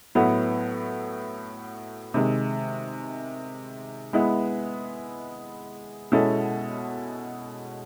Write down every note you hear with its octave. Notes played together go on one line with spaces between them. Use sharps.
A2 F#3 B3 E4
C3 D#3 G#3
G#3 B3 E4
B2 G#3 C#4 E4 A4